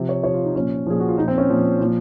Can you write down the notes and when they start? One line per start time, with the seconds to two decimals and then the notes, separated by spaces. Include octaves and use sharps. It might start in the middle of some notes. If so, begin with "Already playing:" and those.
Already playing: C3 F3
0.09 C#5
0.24 C3 F3 C#5
0.34 F4
0.44 D#4
0.56 A#2 F3 C#4
0.87 A#2 F3 G#4
1.00 F#4
1.08 F4
1.18 A#2 F3 D#4
1.28 C4
1.38 C#4
1.49 A#2 F3
1.80 A#2 F3